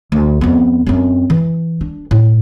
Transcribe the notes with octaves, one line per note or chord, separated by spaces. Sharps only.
D2
F2 B3
F#2 C4
E3
D4
A2